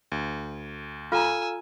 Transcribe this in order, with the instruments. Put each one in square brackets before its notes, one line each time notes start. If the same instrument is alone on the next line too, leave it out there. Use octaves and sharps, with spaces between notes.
[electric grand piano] D2
[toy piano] F4 A#5 [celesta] A4 F5 F6 [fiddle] G#5 E6